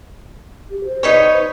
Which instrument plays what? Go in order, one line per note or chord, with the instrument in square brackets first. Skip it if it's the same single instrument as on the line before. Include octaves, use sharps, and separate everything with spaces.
[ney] G4
C5
[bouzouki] D#4 B4 C#5